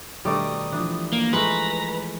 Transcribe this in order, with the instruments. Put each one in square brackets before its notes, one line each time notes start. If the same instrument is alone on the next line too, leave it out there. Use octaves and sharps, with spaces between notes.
[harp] B2 D#3 D4 [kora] G3 A3 D5 [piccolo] D#6
[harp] E3 F3 [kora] D4
[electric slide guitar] A#3
[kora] G#3 A3 [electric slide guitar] B4 [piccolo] A#5